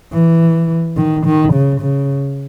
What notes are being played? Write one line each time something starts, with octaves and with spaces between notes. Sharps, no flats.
E3
D#3
D#3
C#3
C#3